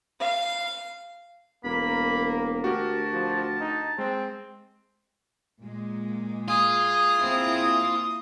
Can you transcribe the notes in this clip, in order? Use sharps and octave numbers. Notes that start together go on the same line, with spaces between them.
F5
E1 A#3 B5
D2 F#4 G4 A#4 A5
F3
D#4
G#3 C4
A#2 G#3
F4 G#4 D#6
A#3 C4 E4